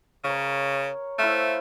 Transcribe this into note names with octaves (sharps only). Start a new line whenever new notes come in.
C#3 A#4 C#5
A3 E4 C5 F5